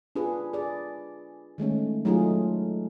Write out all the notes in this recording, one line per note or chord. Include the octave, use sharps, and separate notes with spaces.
D4 F4 G#4 B4
G#4 D5
D#3 G#3 A3 C#4
F#3 A3 D#4 F4 G#4